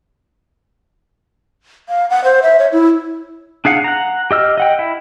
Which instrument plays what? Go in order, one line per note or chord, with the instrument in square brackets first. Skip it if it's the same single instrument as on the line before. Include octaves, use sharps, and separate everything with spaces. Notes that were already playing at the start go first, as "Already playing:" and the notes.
[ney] F5
F#5
C5
E5
C#5
E4
[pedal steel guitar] D4 G#4 F5 F#5
F#5 A#5
G4 D#5 E6 F6
D#5 F#5 G5
E4